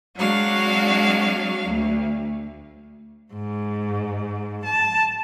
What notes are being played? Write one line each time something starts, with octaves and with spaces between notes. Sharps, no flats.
F#3 G#3 C4 D4 F#4 F5
D2
G#2
A5